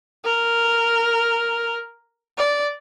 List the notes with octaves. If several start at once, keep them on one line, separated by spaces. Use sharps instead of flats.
A#4
D5